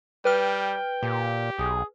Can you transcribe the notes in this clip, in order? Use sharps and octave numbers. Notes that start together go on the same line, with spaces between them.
G3 B4 G5 F6
A#2 G4
B1 G#4